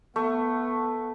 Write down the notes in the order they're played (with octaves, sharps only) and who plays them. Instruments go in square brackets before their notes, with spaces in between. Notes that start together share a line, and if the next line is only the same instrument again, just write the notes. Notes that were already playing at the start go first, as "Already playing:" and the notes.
[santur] A3 [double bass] B3